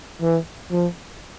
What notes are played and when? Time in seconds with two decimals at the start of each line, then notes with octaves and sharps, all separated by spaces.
0.22 E3
0.71 F3